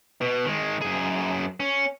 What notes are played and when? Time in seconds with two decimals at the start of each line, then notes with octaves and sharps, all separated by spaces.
0.21 B2
0.45 D#3 G#3
0.82 F#2 G#4
1.60 C#4